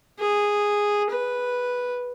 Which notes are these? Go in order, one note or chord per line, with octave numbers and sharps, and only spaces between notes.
G#4
B4